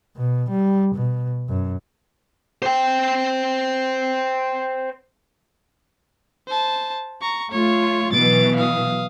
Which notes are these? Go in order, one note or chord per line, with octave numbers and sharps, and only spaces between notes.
B2
G3
B2
F#2
C5 G5
C5 A5
A#5 C#6
A3 F4 C#5
B2 E3 F#3 A6 D7
F5 D#6